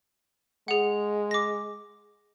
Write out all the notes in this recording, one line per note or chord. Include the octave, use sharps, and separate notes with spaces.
G#3 G#4 F#5
D6 A#6